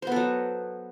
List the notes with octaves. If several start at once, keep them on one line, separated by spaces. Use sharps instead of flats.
F#3 B3 A4 C5